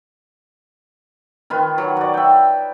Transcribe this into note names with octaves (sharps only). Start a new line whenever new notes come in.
D#3 F4 B4
F#3
F#4 D5
E5 G5